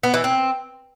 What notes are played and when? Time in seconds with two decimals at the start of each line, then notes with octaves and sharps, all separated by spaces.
0.03 B3
0.14 E3
0.24 C4